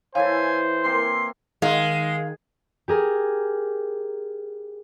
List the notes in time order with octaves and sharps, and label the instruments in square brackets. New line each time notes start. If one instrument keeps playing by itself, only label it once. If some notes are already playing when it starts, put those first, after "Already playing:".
[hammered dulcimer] E3 E4 A4 [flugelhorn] C5 [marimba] C#5 F5 [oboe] G#5
[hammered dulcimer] A#3 C4 E4 [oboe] C6
[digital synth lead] D#3 [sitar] G#3 [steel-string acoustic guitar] F5
[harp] G4 G#4 A#4